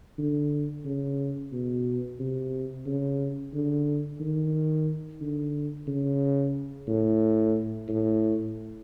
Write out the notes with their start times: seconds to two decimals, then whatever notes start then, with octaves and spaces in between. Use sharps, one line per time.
0.18 D3
0.85 C#3
1.52 B2
2.19 C3
2.85 C#3
3.54 D3
4.20 D#3
5.21 D3
5.87 C#3
6.87 A2
7.88 A2